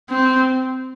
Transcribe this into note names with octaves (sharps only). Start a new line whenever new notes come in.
C4